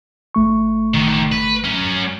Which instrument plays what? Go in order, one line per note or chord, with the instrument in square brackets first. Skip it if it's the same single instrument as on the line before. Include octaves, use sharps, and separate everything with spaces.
[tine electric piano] G1 A3 C#6
[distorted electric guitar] D3 D#3
B4
F#3 C#4